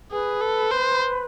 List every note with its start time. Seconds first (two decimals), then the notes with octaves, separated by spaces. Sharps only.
0.11 G#4 B4
0.41 A4
0.71 C5